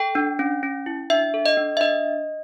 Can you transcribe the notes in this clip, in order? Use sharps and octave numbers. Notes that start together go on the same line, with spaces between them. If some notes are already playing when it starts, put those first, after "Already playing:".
Already playing: A4 G5
D4
C#4
C#4
E4
D4 E5
A4
D#5
D4
E5
D4 D#5